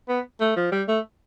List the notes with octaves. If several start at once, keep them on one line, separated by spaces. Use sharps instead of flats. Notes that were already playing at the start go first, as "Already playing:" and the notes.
B3
A3
F3
G3
A3